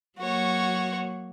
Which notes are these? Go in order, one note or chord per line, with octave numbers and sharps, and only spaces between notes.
F#3 A#3 F#4 C#5